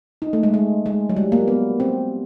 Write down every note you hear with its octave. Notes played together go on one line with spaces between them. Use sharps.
D#4
A3
G#3
G#3
G#3
F#3
G3
A#3
B3
C4